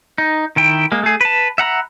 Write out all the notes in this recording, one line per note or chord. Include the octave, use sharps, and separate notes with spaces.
D#4
D#3 E4 G5
G#3 A#3
A3 G#4
B4 A5
E5 F#5 A#5 B5